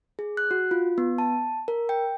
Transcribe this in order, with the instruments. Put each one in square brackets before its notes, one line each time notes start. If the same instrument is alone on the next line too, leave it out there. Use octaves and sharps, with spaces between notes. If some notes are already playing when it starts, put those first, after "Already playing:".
[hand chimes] G#4
F#6
F#4
F4
B3
A5
A#4
G5